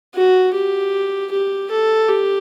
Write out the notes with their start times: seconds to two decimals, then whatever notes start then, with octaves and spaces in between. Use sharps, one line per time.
0.15 F#4
0.54 G4
1.32 G4
1.71 A4
2.08 G4